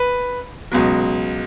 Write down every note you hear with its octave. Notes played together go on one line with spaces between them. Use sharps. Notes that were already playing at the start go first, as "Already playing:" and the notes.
Already playing: B4
C#2 B2 F#3